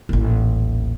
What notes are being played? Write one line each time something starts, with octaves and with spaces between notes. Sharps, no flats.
D#1 A1